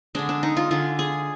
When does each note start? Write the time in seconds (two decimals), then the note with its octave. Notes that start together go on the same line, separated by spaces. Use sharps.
0.15 D3 G#3 D4
0.29 D4
0.43 D#4
0.57 F4
0.71 D3 G#3 F4
0.99 G#4